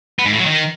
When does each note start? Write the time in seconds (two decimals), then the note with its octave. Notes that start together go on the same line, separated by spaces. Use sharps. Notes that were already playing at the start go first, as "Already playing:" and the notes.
0.19 B3
0.26 G#2
0.32 A2
0.39 F#3
0.46 D#3